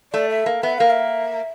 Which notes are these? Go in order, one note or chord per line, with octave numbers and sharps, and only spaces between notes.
A3 D5
E5
A#3
B3 E5
A#3 F5
E5